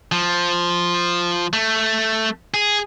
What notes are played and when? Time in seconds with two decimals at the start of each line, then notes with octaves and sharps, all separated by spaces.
0.12 F3
1.53 A3
2.54 G#4